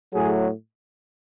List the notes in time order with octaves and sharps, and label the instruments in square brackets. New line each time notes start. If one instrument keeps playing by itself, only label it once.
[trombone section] A2 F#3 G#4